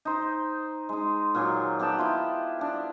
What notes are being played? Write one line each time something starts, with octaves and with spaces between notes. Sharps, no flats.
D#4 C5
G#3 D#4
A#2 D#3 F#3 G#4
B3 G4 G5 A5
E4 F4
D4 G5